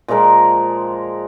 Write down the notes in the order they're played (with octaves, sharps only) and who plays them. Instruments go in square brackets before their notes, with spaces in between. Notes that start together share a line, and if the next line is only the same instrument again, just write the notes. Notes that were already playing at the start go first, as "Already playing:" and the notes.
[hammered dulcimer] A#2 F3 G#3 A#4